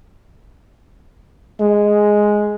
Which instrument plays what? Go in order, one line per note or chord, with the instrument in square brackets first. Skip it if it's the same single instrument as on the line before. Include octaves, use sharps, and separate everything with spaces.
[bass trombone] G#3